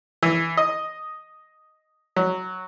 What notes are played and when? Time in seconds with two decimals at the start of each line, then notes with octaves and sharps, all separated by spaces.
0.23 E3
0.57 D#5
2.16 F#3